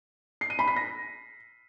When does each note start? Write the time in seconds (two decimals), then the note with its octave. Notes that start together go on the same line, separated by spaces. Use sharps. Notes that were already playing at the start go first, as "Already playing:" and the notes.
0.41 C7
0.50 D#7
0.59 B5
0.68 B6
0.76 A#6